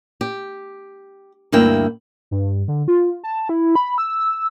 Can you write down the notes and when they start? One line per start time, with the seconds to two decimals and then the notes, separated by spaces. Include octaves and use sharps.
0.21 G4
1.52 D2 G2 A#3 E4 G5
2.31 G2
2.68 D3
2.88 F4
3.24 A5
3.49 E4
3.76 B5
3.98 E6